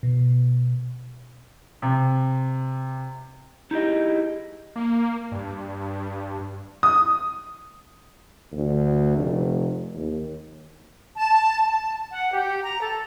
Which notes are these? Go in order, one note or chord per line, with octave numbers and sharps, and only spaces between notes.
B2
C3
D#4 E4 G4 G#4 D#5
A#3
G2
D#6
D2
F1
D#2
A5
A5
F#5
G4
A#5
A4